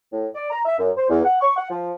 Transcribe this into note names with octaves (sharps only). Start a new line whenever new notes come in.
A2
D5
A#5
E5
F#2
C5
E2
F#5
C#6
F#5
F3